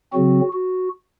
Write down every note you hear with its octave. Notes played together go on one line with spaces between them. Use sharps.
C#3 F#3 C4 F#4
F#4